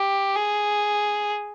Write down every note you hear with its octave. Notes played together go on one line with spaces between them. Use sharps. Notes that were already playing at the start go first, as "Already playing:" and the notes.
Already playing: G4
G#4